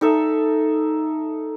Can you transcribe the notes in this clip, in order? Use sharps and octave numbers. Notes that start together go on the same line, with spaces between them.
D#4 A4 E5